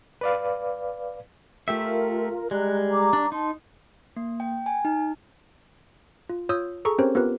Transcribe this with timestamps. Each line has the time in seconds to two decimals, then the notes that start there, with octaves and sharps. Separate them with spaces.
0.21 B4 D5 F5
1.68 A3 F4 G4 A#4 E5
2.51 G3 G#3 A#5 F#6
2.90 A#5 D6
3.13 D4
3.32 D#4 A5 C6
4.16 A#3
4.40 G5
4.66 G#5
4.85 D#4
6.29 F4
6.49 F4 C#5 D#6 E6 G6
6.85 G#4 A4 A#5 C#6
6.98 C4 C#4 G4 A#4 C5 C#5
7.15 B3 F4 G4 A#4 B4